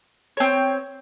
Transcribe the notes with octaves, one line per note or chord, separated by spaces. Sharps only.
C4 C#5